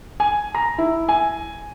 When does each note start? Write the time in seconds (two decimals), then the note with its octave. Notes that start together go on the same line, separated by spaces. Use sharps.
0.20 G#5
0.55 A#5
0.78 E4
1.09 G#5